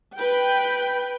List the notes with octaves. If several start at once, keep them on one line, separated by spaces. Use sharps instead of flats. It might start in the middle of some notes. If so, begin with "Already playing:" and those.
B4 G5